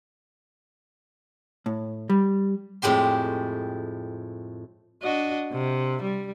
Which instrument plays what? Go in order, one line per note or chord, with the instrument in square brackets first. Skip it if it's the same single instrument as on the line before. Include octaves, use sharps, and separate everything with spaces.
[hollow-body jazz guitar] A2
G3
[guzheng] F2 A2 G#3 G4 C6
[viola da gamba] D4 F#4 D#5
C3
G3